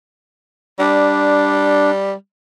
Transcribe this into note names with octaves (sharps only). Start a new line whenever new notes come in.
G3 D4